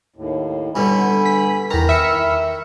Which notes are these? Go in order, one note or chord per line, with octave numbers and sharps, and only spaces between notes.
D#2 A2
G2 B2 D3 G#5 B5
B6
E2 D#3 A#5
E5 B5 E6 F6 C#7